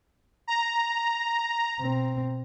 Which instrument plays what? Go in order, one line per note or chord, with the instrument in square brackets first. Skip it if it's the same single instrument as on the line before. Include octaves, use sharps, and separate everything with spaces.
[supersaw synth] A#5
[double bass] B2 C4